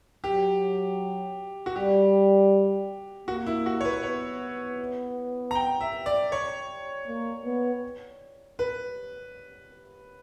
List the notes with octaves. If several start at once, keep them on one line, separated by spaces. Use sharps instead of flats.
F#3 G4
F#4
G3 G4
A#3 F#4
E4
F#4
C#5
B4
B3 C#5
A#5
G5
E5
D5
C#5
A#3
B3
B4